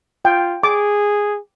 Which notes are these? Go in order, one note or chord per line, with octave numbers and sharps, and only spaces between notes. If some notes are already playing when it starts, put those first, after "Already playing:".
F4 G5
G#4 D6